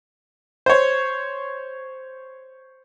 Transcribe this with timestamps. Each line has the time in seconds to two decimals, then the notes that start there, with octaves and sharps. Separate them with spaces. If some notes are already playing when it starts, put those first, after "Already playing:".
0.66 C5 C#5